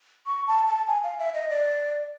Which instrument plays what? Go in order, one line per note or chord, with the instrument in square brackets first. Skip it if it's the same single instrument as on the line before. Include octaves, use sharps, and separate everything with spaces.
[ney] C#6
A5
A5
G#5
F5
E5
D#5
D5